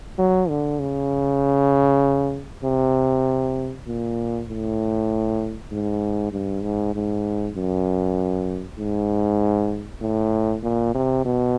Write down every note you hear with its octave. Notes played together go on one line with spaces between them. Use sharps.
F#3
D3
C#3
C3
A#2
A2
G#2
G2
G#2
G#2
F#2
G#2
A2
A#2
C3
B2